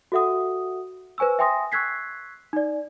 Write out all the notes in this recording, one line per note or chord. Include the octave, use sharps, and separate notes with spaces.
F#4 A4 E5 F#5 D#6
B4 C5 G#5 C#6 E6
E5 G5 G#5 C6 D#6 A#6
C#6 E6 F#6 G#6 B6 C7
D#4 D5